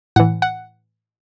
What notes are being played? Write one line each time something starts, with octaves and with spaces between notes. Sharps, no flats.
A2 E3 F#5
F#5